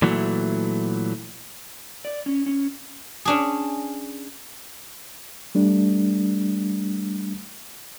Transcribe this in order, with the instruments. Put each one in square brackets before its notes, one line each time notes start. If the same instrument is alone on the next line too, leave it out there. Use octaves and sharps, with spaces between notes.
[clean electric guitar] A#2 E3 F#3 A3
[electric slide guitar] D5
C#4
C#4
[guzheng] C#4 D4 G#4
[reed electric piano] G3 A3 D4